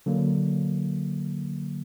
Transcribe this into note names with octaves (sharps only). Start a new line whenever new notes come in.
D3 F#3 A#3